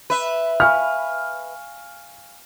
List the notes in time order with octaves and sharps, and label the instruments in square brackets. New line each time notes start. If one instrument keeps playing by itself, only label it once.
[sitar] B4 E5
[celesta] F5 G#5 C#6 [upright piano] F6